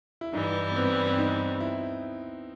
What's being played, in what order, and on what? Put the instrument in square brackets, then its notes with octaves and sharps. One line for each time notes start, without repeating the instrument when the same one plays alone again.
[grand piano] E4
[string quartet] G2 E3 G3 [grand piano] D#4
[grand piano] B3
C4
C4
D#4
E4